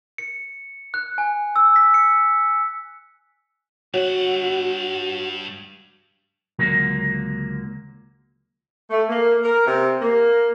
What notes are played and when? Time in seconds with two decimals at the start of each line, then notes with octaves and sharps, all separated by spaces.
0.18 C#7
0.94 F#6
1.18 G#5
1.56 E6
1.76 B6
1.94 C#7
3.94 G2 F#4 C#5 F#5
6.59 C#2 D3 F#3 A#3
8.90 A3
9.09 A#3
9.43 A#4
9.67 C3
10.01 A#3